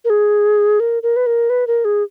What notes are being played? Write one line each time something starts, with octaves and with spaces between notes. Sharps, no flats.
A#4
G#4
A#4
A#4
B4
A#4
B4
A#4
G#4